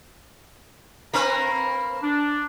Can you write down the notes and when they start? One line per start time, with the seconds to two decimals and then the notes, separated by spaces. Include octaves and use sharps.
1.14 A#3 C4 B4 A#5
2.03 D4